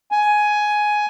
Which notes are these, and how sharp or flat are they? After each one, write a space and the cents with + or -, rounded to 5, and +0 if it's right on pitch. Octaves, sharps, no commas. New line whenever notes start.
G#5 +10